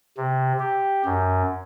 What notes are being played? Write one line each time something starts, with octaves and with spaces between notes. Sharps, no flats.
C3
G4
F#2